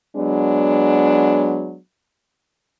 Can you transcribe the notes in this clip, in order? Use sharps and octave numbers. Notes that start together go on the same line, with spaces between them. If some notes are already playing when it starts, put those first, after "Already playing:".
F#3 G#3 B3 D4